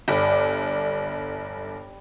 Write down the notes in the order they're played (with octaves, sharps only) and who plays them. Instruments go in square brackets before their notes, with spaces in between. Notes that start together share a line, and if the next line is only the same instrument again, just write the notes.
[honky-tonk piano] G1 [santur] G3 D5 B5